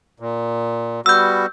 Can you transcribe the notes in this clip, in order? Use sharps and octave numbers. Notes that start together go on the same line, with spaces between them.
A#2
G3 B3 F#4 E6 G6